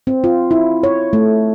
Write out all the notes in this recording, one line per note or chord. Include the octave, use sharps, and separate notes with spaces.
C4
F4
E4
C#5
A3